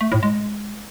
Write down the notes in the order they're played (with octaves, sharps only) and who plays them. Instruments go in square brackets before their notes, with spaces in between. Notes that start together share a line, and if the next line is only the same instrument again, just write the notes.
[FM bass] A3
A2
G#3